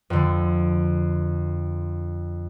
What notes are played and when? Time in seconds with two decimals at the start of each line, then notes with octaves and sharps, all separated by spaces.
0.10 F2 D3